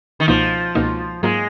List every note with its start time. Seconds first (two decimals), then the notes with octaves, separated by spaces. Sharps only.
0.20 D#3
0.28 C#2 B2 F3 A#3 D#4
0.75 C#2 B2 A#3 D#4
1.23 G#2 F#3 G#3 A#3 F4